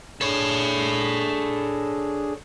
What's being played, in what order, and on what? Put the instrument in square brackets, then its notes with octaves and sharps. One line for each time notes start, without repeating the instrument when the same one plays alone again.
[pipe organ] D4 G#4 [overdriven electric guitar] A4 C#5